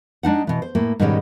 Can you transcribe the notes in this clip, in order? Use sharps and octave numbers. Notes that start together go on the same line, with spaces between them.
G#3 D4 D#4 F#5
B2 E3
C5
A2 A#3
G#2 B2 D#3 G3 G#3 C#4